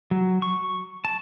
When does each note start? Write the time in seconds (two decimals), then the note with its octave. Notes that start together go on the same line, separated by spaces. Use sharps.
0.11 F#3
0.42 C#6
1.05 A5